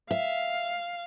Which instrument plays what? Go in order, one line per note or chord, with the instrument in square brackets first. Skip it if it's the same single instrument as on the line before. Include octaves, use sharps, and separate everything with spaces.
[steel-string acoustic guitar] E5 [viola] F5